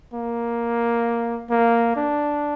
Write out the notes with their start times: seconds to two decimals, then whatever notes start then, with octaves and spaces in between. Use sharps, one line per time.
0.14 A#3
1.50 A#3
1.96 D4